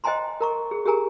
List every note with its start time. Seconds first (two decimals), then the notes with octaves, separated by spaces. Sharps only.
0.04 C5 D#5 G5 G#5 A#5 C6
0.40 A#4 A#5 C#6
0.71 G#4
0.86 G4 G#4 A#4 G#5 A#5